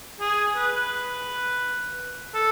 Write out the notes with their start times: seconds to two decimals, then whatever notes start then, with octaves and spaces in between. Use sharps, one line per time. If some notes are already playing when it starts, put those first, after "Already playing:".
0.20 G#4
0.56 B4
2.34 A4